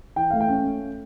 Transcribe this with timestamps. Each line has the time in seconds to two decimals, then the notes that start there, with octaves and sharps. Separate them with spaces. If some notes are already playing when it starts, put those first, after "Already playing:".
0.16 E3 G5
0.30 A3 F5
0.41 G5
0.49 C#4
0.65 A3